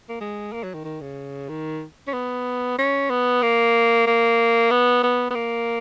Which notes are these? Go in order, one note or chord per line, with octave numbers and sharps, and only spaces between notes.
A#3
G#3
A#3
F#3
D#3
D#3
C#3
D#3
C#4
B3
C#4
B3
A#3
A#3
B3
B3
B3
A#3